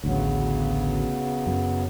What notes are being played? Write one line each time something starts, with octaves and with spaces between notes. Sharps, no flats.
A1 D2 C#3 F#3 B3
F#2